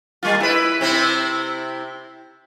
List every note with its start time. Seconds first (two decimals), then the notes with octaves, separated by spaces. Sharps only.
0.23 G3 A#3 F4
0.40 E4 B4
0.81 C3 C4 E4